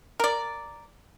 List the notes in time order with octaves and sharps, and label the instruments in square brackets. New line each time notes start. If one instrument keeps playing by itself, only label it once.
[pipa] A#4 D5